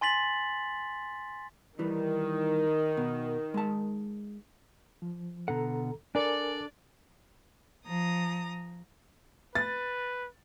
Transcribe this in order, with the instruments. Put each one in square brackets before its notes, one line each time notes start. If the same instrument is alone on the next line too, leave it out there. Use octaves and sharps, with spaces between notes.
[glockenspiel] G#5 C6 A6 B6 F#7
[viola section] D#3 [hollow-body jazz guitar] E3 G3
[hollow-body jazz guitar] B2
G#3 A5
[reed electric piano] F3
[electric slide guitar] B2 D3 F#5 [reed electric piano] A4 A#5
[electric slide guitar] D4 A4 [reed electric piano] A#4 G#5 [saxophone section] D5
[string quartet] F3 A#5 D#6
[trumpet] B4 [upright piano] A6